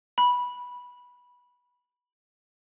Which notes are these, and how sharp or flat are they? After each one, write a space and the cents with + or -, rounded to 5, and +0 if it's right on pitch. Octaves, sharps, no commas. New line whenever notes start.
B5 -10